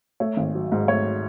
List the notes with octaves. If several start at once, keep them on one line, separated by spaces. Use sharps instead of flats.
A3 C#5
G#1
F#3
G#2
A3 C#5